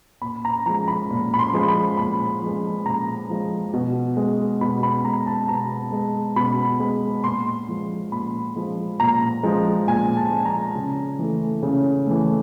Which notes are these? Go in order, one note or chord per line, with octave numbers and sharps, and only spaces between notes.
A#2 B5
A#5
F3 G#3 A#5
B5
A#2
B5
C6
F3 G#3
B5
A#2 B5
F3 G#3
A#2 A#5
F3 G#3
B2
G#3
B2 B5
B5
G#3 A#5
A5
B2 A#5
G#3
B2 B5
G#3
A#2 C6
F3 G#3
A#2 B5
F3 G#3
A#2 A#5
F3 G#3
A#2 G#5
A5
F3 G#3
A#5
C#3
E3 A3
C#3
E3 A3